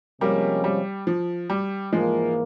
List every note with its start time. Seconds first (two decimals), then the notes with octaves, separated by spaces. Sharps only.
0.21 C3 F3 G3 G#3 A#3 C#4
0.64 G3
1.07 F3
1.50 G3
1.92 G#2 E3 F3 G#3 A#3